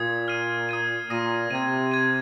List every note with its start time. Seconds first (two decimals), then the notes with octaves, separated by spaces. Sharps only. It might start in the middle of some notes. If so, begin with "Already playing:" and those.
Already playing: A#2 D#6 G#6
0.28 F6 C7 D#7
0.69 D#6 G#6 D#7
1.09 A#2 D#6 A#6 D#7
1.50 C3 G#6 D#7
1.92 G#6 D#7